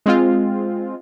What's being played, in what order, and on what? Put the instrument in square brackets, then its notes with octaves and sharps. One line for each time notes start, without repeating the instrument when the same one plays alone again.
[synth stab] G#3 C4 F4